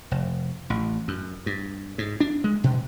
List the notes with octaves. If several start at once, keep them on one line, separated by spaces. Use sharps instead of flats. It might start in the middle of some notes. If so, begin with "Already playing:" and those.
F1
A1
F#2
G2
G#2
D4
G#3
B2